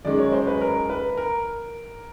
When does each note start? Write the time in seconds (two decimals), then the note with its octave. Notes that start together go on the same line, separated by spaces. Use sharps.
0.05 F#2 D#3 G#3 D5
0.19 C#5
0.33 C5
0.47 B4
0.61 A#4
0.90 B4
1.17 A#4